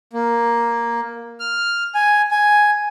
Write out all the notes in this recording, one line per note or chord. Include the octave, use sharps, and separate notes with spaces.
A#3
F6
G#5
G#5